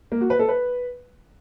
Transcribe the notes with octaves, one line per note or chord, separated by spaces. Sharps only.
A#3
F#4
B4
A4
B4